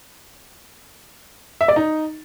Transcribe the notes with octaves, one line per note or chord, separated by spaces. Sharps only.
E5
D5
D#4